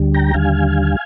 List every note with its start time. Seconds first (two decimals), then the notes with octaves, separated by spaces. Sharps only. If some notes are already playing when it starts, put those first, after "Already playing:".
Already playing: D2 D3 G3
0.14 G5 A#5
0.34 D#2 D3 G3 F5 G#5